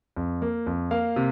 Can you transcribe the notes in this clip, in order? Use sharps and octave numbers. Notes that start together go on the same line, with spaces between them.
F2
A#3
F2
A#3 F5
C3